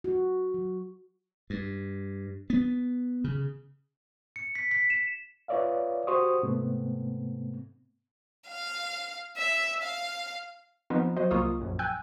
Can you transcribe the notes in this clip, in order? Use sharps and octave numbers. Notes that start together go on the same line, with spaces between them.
F#4
F#3
G2
B3
C#3
C#7
B6
B6
E7
F4 B4 C#5 D5 E5 F5
F#4 G4 C5 C6 C#6 D#6
G#2 C3 A3 B3 C4
F5
E5
F5
F3 B3 C4 D#4 F4
F#3 F#4 C5 D#5
C2 A#3 F4 C#6 D#6
A#1 F#2
G5 G#5 E6 F#6 G6